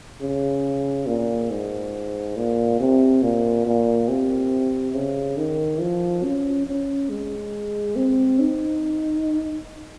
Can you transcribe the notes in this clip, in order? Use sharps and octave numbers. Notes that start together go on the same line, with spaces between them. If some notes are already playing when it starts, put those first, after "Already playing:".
C#3
A#2
G#2
A#2
C3
A#2
A#2
C3
C#3
D#3
F3
C#4
C#4
G#3
C4
D#4